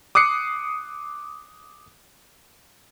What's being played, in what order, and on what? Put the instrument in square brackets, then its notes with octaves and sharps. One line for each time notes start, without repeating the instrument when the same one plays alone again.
[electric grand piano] D6 D#6 F#6 C7 C#7